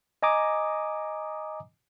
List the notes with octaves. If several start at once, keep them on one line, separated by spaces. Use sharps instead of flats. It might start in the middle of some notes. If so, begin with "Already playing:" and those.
D#5 G#5 A#5 D6 D#6